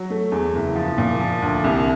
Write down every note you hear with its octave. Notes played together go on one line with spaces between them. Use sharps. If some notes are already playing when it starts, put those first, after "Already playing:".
Already playing: F#3
A3
E2
F#1
F3
A#2
F3
D2
C2